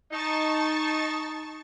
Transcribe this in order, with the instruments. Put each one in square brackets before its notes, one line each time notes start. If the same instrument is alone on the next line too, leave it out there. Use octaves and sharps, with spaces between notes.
[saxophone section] D#4 [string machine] A5 C#6 A6